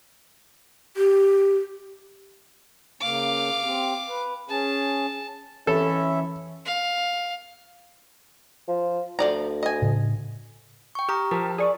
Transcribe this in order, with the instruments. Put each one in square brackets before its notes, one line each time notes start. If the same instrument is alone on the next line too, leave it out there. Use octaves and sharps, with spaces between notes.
[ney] G4
[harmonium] C#3 A#3 [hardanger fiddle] F5 D6
[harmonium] C4 G4
B4
[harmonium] C#4 G#4 [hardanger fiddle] A5
[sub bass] E3 [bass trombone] C#4 [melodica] E4 E5 [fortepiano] A4
[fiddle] F5
[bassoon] F3
[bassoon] D2 [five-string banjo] F3 D5 A#5
[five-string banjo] D#5 G#5
[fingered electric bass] A2 C#3 D4
[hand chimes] G5 C#6
[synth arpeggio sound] G4 [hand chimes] A#5 D#6 F6
[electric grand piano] F3 [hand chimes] A#4 [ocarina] A5
[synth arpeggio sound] G#4 C#6 D#6 [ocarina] D5